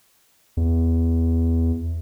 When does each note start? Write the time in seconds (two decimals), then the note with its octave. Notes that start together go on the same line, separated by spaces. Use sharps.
0.57 E2